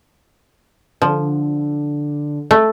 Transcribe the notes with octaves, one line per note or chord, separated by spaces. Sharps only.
D3 F3
A3